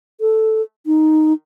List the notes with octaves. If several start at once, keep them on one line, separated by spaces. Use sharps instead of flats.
A4
D#4